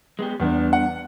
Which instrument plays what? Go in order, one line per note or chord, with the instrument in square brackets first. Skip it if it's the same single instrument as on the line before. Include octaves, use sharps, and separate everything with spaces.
[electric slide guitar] G#3 B3 G4
[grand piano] E2 [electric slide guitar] G3 B3 D4
[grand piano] F#5